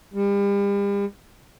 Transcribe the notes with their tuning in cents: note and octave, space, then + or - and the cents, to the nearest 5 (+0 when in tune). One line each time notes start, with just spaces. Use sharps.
G3 +40